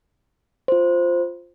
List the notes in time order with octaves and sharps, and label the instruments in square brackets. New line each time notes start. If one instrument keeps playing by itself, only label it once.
[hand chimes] F4 C5